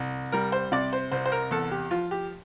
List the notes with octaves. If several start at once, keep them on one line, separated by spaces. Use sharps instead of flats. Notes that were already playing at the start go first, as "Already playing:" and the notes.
Already playing: C2
G3 A#4
C5
C3 D5
C5
C2 C5
C5
A#4
E2 A4
G4
F3 F4
G4